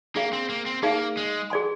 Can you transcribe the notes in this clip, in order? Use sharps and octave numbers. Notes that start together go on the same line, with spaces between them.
A#3 D4 G#4 D5 F5
C4
A#3
C4
A#3 D#4 G#4 D5 F5
G#3
G#4 D5 G#5 C6